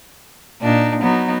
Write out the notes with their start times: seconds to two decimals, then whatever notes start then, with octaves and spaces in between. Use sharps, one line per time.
0.61 A#2 D4 D#4
1.01 F#3 B3 D#4